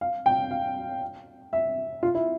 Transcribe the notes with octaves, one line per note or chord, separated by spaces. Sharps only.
F5
G5
F5
E5
F4
E4